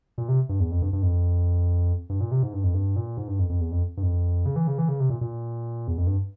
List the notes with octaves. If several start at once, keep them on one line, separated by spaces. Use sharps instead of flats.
A#2
C3
G2
E2
F2
G2
G2
F2
G2
A#2
C3
G#2
G2
F2
G2
A#2
G#2
G2
F2
F2
E2
F2
G2
F2
C#3
E3
C#3
E3
C#3
C3
A#2
A#2
E2
F2
G2